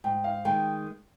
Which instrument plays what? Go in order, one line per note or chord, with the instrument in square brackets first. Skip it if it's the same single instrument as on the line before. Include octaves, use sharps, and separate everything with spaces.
[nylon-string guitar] G#2 [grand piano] G5
[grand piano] F5
[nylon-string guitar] D#3 G#3 [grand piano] G5